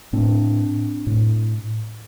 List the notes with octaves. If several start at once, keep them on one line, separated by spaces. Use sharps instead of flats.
A2 C4 D4
A2